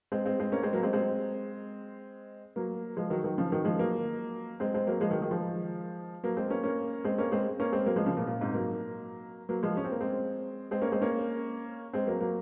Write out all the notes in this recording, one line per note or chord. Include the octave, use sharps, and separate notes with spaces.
G#3 C4
G#3 C4
G#3 C4
A#3 C#4
G#3 C4
F#3 A#3
G#3 C4
G#3 C4
F#3 A#3
F3 G#3
D#3 F#3
D#3 F#3
C#3 F3
D#3 F#3
F3 G#3
F#3 A#3
G#3 C4
G#3 C4
F#3 A#3
F3 G#3
D#3 F#3
D#3 F#3
F3 G#3
F#3 A#3
G#3 C4
A#3 C#4
A#3 C#4
G#3 C4
A#3 C#4
G#3 C4
A#3 C#4
G#3 C4
F#3 A#3
F3 G#3
C#3 F3
A#2
A#2
G#2 C3
F#3 A#3
F#3 A#3
F3 G#3
C#4
C4
A#3
G#3 C4
G#3 C4
A#3 C#4
G#3 C4
A#3 C#4
G#3 C4
F#3 A#3
F#3 A#3